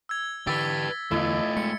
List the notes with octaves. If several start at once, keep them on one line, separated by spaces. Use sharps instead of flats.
E6 G#6
D3 E3 G4 B4 E6 A6 B6
E2 D3 E3 A3 E4 F4 D#5
G#3 C#7